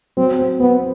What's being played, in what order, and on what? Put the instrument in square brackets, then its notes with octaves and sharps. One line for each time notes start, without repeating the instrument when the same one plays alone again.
[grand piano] F#3 [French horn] C4
[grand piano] C4
[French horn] B3 [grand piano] C4